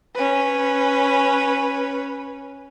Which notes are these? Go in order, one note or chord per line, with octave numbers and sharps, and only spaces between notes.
C#4 B4